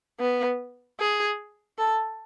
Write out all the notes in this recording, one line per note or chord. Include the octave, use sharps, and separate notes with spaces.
B3
G#4
A4